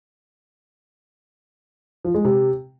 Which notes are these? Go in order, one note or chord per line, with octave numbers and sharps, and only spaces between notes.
F3
G#3
C3